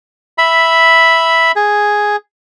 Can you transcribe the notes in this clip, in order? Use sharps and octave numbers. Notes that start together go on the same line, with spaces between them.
E5 B5
G#4